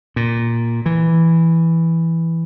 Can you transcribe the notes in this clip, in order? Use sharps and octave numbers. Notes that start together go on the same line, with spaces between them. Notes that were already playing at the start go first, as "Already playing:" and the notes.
A#2
E3